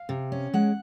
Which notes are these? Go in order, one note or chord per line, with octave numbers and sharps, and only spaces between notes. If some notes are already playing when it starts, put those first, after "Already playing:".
Already playing: F5
C3
C#4
G#3 F#5